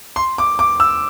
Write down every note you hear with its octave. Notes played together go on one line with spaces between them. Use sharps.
C6
D6
D6
E6